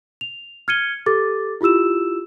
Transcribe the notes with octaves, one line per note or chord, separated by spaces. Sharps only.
F7
F6 G#6 C#7 D#7 G7
G4 A4 D6 A6
E4 F4 G4 E6 E7